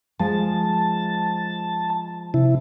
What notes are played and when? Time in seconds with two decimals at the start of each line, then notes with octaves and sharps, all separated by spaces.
0.20 F3 G#3 G#5 A5
2.34 C3 E4